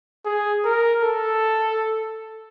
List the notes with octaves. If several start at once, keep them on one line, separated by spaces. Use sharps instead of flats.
G#4
A#4
A4